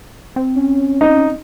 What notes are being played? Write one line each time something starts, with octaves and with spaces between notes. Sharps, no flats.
C4
C#4
D#4